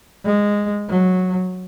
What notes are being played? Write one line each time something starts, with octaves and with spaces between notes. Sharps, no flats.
G#3
F#3